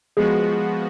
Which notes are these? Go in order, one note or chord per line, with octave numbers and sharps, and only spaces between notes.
F3 G#3 B3 F#4 G#4